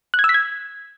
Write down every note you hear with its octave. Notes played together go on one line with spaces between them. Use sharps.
F#6
G#6
E6
B6
G#6